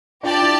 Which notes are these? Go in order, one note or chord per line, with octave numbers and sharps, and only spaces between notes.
D4 F4 G4 D5 A5
E4